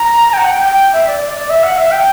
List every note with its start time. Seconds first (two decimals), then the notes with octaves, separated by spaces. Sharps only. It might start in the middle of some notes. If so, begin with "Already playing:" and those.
Already playing: A#5
0.33 G5
0.38 F#5
0.51 G5
0.65 G5
0.93 E5
1.07 D5
1.21 D5
1.35 D5
1.50 E5
1.63 F#5
1.77 E5
1.91 G5